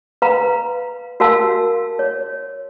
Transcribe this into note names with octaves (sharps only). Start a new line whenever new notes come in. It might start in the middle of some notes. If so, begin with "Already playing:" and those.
B4 F5 A#5
F#4 A#4 F5 A5 E6
C#5